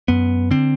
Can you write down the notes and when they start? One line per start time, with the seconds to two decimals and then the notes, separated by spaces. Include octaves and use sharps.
0.08 F#2 B3
0.51 D3 C4